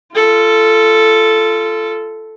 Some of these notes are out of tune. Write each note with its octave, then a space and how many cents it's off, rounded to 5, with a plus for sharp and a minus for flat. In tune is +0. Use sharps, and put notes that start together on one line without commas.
F4 -25 A4 +0